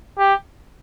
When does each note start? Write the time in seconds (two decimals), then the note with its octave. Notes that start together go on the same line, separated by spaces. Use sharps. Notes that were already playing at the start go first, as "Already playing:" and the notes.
0.19 G4